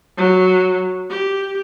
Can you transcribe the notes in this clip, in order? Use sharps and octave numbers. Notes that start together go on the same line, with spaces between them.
F#3
G4